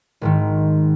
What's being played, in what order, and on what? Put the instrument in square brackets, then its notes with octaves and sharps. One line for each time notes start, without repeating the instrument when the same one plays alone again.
[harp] G#1 G#2 D#3